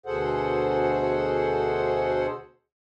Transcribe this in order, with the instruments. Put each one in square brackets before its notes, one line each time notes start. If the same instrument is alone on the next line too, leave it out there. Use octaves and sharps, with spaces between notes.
[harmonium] D2 B2 G#4 A4 C5 F#5